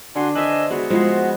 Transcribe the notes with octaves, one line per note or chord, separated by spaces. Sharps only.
D3 D4 F#4 G#5 C6
B4 C5 D#5 E5 G#5 E6
G#3 B3 F#4
F3 G#3 E4 G#4 C5